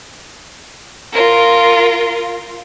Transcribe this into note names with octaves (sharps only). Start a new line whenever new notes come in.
F4 A#4